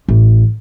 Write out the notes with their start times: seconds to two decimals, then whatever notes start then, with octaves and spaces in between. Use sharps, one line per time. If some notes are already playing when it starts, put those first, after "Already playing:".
0.08 A1